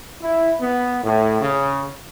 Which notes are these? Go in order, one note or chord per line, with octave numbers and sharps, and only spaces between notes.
E4
B3
A2
C#3